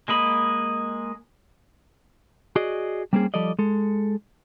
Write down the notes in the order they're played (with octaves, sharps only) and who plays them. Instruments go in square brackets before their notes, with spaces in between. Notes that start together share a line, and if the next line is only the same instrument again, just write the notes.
[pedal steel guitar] G#3 A#3 D#5 B5
[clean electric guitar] F#4 G#4 D5 D#5
G3 A#3 C4 C#4 G#4
F3 G3 A4 D5 D#5
G#3 A4